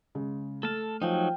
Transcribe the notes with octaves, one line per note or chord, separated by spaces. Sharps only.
C#3 G#3
A3 A4 A5 F6
F3 F#3 D#4 G5 G#5